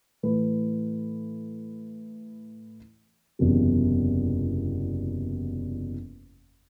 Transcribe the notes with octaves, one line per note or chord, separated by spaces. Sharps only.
A2 E3 A3 E4 B4
F#1 E2 C3 F#3